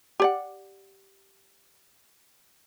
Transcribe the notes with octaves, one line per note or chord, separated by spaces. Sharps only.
G4 D5 F#5